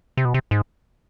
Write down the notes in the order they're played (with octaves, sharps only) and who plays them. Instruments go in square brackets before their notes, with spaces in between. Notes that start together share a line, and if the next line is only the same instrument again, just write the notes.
[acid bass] C3
B2
C3
G#2